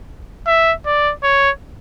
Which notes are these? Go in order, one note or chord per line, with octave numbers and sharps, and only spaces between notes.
E5
D5
C#5